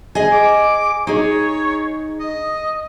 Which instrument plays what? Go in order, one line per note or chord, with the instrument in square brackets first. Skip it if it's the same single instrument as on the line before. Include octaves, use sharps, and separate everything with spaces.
[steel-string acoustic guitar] G#4 D#5 G#5
[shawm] D6
[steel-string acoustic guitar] D#4 G#4 [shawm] C#5
[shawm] D#5